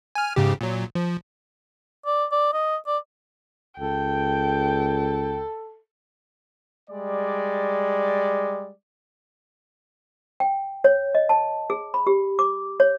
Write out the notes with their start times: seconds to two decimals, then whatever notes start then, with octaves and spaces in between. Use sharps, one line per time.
0.15 G#5 F6
0.36 G#2 C#3 G4
0.61 A#2 F#3
0.95 F3
2.06 D5
2.31 D5
2.53 D#5
2.87 D5
3.80 C#2 A4 G5
6.90 G3 G#3 D5
10.40 G5
10.84 C#5
11.15 D#5
11.29 A5
11.70 G#4
11.94 B5
12.07 G4
12.39 D6
12.80 C#5